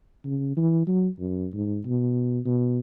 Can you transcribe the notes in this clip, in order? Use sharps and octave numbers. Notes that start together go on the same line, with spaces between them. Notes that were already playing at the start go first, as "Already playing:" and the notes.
C#3
E3
F#3
F#2
G#2
B2
B2